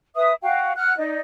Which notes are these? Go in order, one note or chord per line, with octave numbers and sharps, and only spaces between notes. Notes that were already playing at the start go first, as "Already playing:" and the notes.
B4 E5 D#6
F#4 F5 G5
F#5 F6 F#6
D#4 D5